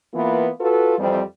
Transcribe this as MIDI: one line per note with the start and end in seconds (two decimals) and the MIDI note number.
0.15 0.49 52
0.15 0.49 58
0.15 0.49 59
0.15 0.49 65
0.60 0.95 65
0.60 0.95 66
0.60 0.95 69
0.60 0.95 71
0.99 1.21 41
0.99 1.21 52
0.99 1.21 55
0.99 1.21 60